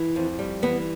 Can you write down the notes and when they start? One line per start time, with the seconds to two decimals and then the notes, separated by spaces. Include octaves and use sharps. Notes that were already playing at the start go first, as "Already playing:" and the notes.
Already playing: E3
0.16 F2
0.39 G3
0.62 E3 B3